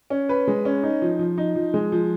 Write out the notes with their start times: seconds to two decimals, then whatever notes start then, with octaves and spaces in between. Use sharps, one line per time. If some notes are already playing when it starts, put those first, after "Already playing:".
0.10 C#4
0.29 B4
0.47 G#3
0.65 C#4
0.83 D#4
1.02 F3
1.19 F3
1.38 D#4
1.55 F3
1.74 G#3
1.92 F3